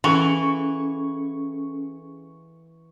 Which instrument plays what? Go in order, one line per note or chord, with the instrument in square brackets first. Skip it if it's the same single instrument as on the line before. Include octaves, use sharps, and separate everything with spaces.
[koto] E3 [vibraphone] C#4 G#4 A4 [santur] C#6